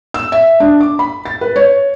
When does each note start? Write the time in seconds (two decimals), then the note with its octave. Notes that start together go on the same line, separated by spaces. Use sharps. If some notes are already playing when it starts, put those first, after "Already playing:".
0.14 E6
0.32 E5
0.60 D4
0.80 D6
0.99 B5
1.25 A6
1.41 B4
1.56 C#5